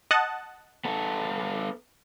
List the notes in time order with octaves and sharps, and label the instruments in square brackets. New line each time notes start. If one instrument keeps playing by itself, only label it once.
[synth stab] D#5 F#5 A5
[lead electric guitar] B3 A4